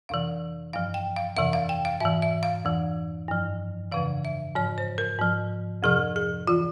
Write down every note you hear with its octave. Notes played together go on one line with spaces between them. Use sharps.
F2 C3 E3 F5
G2 F3 F5
G5
F5
F2 C3 E3 E5
F5
G5
F5
G#2 E3 E5
E5
F5
F2 E3
G2 F3
F2 C#3 E3 F5
E5
G#2 F3 C#5
C5
A#4
G#2 F3
F2 C3 F3 G#4
G#4
E3 F4